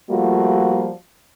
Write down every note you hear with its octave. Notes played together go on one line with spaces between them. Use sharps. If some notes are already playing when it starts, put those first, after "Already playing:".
F3 G3 A3 A#3 F4 F#4